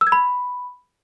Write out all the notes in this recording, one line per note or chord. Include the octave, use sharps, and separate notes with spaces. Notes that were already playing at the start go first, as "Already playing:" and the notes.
E6
G#6
B5